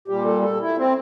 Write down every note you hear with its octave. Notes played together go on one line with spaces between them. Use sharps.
A#2 G3 G4
A4
A4
E4
C4